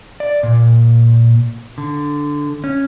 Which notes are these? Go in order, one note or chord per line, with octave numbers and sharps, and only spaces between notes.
D5
A#2
D3
C#4